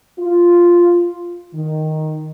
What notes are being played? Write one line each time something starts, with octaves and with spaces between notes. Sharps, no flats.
F4
D#3